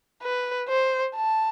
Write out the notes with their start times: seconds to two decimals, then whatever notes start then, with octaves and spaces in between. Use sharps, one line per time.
0.23 B4
0.68 C5
1.16 A5